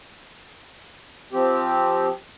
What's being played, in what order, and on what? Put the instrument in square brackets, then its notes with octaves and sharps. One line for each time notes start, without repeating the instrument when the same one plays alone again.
[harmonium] F3 C4 G4